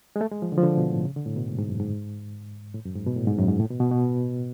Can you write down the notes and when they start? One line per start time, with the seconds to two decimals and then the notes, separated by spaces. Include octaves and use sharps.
0.16 G#3
0.21 A3
0.32 G#3
0.42 F3
0.52 D3
0.58 F3
0.63 D3
0.77 B2
0.91 A2
1.05 C#3
1.16 D3
1.26 A2
1.37 B2
1.48 G#2
1.59 G#2
1.69 F#2
1.80 G#2
2.74 A2
2.85 F#2
2.95 G#2
3.06 B2
3.16 A2
3.27 G#2
3.38 F#2
3.48 G#2
3.60 A2
3.70 B2
3.80 B2
3.91 B2